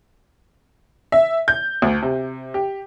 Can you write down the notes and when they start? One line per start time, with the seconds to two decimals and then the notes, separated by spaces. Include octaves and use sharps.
1.12 E5
1.48 G6
1.82 D2
2.02 C3
2.54 G4